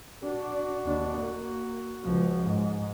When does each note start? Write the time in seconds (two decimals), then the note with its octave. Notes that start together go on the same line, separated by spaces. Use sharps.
0.24 D4 F#4
0.85 D#2 D4
1.17 A#3
2.04 C#2 F3
2.43 G#2